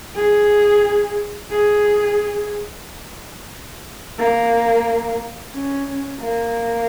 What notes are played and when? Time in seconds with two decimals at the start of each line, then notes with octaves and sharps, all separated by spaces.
0.16 G#4
1.51 G#4
4.19 A#3
5.53 C#4
6.20 A#3